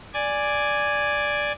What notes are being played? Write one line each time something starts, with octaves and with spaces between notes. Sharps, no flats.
D5 G#5